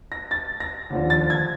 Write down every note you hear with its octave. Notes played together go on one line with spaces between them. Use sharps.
A#6
A6
A#6
D#2 D3 F3
A6
G#6